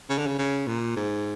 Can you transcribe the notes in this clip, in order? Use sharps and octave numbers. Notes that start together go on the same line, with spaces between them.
C#3
D3
C#3
C#3
A#2
G#2